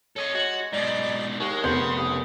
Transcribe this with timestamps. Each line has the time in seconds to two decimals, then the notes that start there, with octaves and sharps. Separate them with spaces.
0.16 A4 C#5 D#5
0.35 G#3 F#4
0.73 G#2 B2 D#4 D5
1.40 D#2 G#3 C#6
1.64 F1 C#3 B3 C6 G6
1.96 D#2 D#6